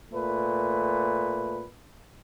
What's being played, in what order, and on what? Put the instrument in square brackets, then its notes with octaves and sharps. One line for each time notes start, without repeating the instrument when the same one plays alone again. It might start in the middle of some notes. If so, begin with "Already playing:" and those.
[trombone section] A#2 A3 B4